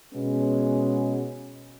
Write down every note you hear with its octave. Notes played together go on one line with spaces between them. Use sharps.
B2 G#3 B3 C#4